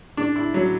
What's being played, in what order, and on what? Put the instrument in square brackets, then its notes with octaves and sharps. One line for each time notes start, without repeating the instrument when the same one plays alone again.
[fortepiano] D4
E4
F#3